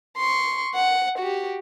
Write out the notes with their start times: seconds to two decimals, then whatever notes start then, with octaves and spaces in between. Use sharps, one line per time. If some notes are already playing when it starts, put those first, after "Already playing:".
0.17 C6 C#6
0.75 F#5
1.19 F#4 G4